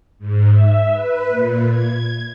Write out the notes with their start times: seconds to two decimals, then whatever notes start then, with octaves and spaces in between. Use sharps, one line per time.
0.18 G#2
0.50 E5
0.90 B4
1.27 A#2
1.68 G#6